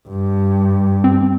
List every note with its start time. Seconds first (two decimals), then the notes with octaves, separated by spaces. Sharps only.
0.08 G2
1.04 C4